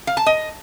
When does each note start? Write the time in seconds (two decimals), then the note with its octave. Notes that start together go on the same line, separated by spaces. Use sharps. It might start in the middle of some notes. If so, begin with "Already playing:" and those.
0.07 F5
0.17 A5
0.26 D#5